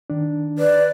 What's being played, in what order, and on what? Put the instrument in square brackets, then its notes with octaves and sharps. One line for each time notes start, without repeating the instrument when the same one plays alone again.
[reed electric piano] D#3 D4
[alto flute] B4 [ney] D5